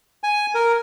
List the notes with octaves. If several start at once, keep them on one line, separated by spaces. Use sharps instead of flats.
G#5
A#4